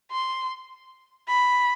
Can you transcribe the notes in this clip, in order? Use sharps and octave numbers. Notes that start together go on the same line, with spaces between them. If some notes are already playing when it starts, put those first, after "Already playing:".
C6
B5